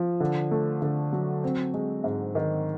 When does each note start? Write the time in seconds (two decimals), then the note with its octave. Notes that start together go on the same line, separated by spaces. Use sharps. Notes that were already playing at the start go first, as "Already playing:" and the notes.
Already playing: F3
0.20 D3
0.51 A3
0.82 D3
1.13 F#3
1.44 C4
1.74 G#3
2.04 G#2
2.35 D#3